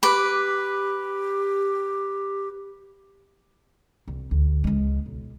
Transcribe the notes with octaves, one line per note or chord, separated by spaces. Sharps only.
G4 B4 D6
C2
D2
C#2 G#3
B1